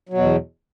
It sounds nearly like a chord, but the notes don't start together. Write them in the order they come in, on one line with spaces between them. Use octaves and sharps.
F#3 B2 E2